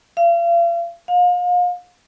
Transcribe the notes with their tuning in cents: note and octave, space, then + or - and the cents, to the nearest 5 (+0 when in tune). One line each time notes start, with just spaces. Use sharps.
F5 -40
F5 +35